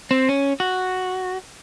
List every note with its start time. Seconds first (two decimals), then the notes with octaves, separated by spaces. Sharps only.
0.11 C4
0.29 C#4
0.60 F#4